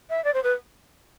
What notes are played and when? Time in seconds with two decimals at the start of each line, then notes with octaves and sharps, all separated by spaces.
0.09 E5
0.24 D5
0.33 C5
0.43 B4